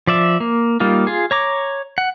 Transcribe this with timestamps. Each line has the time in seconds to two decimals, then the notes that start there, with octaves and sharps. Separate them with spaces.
0.07 F3 D5 E5
0.40 A#3
0.80 G3 A#3 D#4 F4
1.07 F4 G#4
1.31 C#5 A#5 D6
1.98 F#5